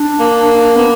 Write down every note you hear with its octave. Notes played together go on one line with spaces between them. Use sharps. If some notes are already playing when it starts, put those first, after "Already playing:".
Already playing: D4
A#3
B3